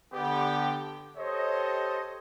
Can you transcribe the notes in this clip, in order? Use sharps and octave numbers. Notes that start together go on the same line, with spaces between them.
D3 B3 G4
G4 A4 C5 C#5 D#5